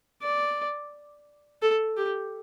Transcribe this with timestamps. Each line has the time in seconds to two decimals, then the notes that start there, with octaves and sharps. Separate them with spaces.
0.22 D5
1.62 A4
1.97 G4